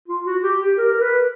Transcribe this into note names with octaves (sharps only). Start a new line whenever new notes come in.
F4
F#4
G4
G4
A#4
A#4
B4